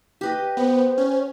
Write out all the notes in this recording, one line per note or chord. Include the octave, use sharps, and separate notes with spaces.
G4 B4 D#5
B3 C5
C#4